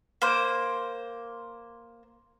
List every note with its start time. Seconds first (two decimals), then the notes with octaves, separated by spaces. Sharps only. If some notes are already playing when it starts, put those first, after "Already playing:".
0.22 A#3 C5